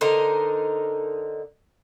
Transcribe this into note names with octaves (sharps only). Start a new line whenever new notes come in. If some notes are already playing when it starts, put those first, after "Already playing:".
D3 D#4 A#4 C5